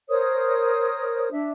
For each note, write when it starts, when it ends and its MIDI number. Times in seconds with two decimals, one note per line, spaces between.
0.09 1.29 70
0.09 1.29 72
0.09 1.29 73
0.09 1.29 87
1.32 1.51 62
1.32 1.51 76